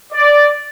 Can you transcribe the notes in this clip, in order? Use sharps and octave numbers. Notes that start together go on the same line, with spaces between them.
D5